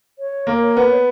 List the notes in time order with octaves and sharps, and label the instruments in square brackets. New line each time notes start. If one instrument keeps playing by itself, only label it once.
[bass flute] C#5
[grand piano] A#3
[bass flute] C#5
[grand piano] B3